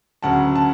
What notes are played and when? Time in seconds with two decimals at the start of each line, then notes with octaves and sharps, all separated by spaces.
0.23 D2 C#3 F#3 F#5 A5
0.56 A5